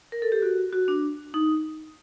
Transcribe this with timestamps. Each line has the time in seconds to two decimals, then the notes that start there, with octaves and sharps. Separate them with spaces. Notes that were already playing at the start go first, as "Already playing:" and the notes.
0.12 A#4
0.22 A4
0.32 G4
0.42 F#4
0.73 F#4
0.88 D4
1.34 D#4